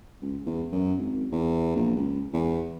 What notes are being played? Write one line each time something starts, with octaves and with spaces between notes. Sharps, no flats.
C#2
E2
F#2
G#1
E2
A#1
C#2
E2